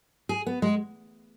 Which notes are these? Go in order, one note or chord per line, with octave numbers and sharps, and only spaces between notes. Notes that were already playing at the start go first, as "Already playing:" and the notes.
G#4
B3
G#3